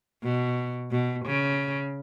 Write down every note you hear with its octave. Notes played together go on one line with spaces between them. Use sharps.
B2
B2
C#3